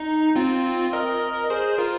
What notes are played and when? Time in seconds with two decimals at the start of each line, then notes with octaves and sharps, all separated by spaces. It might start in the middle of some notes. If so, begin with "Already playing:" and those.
Already playing: D#4
0.36 C4 F4
0.93 A#4 D#5
1.50 G#4 C5
1.78 F4 A#4